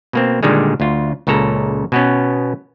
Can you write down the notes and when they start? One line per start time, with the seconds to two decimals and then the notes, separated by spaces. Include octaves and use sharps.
0.13 B2 A#3 C4
0.43 A#2 D3 D#3 G3 G#3
0.80 D2 F4
1.27 C#2 A#2 C#3 A4 A#5
1.92 B2 B3 C#4